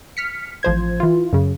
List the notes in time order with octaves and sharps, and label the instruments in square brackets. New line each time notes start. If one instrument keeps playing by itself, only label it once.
[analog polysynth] F6 B6 C#7
A1 F3 C5 G#6
E3 F4
F#2 C#3